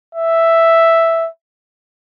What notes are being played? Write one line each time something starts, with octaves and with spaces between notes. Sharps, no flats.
E5